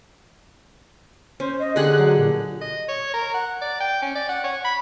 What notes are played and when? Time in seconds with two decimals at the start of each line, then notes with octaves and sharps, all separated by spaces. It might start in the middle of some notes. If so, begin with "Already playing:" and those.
1.40 C#4 C5
1.59 D#5
1.76 D3 D4 G4 G#4 F#6
1.99 F#3
2.18 A#2
2.61 D#5
2.88 C#5
3.14 A#4
3.34 F#5
3.61 D5
3.80 G5
4.02 C#4
4.15 D5
4.29 F#5
4.44 C#5
4.64 B5